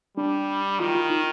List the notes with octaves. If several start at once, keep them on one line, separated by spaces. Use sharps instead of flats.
G3 D4
D#3 F4
F4
D#4